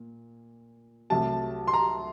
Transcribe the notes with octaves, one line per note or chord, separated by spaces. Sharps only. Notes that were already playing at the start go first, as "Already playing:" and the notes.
Already playing: A#2
C2 C3 F#3 A3 A5
C6
A#5